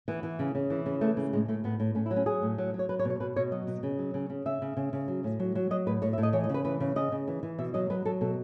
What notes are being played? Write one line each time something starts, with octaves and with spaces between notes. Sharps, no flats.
E3 B3
E3
C#3
C#3
E3
C#3
E3 A3
C#3
A2 G#3
A2 A3
A2 B3
A2
A2 C#4
E4
F#3
C#4
F#3 G#4
A2
F#3
F#3
C#5
F#3 B4
C#5
B2
C#5
B2 B4
B2 C#5
F#3 D#5
B2
C#3
F#3
C#3
C#3
C#3 E5
C#3
C#3
C#3
F#3
A2
F#3
F#3
F#3 D#5
A2 B4
A2 C#5
E5
A2
D#5
E3 C#5
D#5
C#3 B4
E3 B4
C#3
C#3 D#5
C#3
E3
E3
B2 E5
F#3 D#5
F#3 B4
F#3 A4
B2 A4